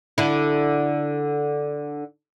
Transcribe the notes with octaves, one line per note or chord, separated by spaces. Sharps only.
D3 E4